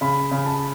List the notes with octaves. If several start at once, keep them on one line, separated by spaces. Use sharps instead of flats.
C#3 B5
C#3
A5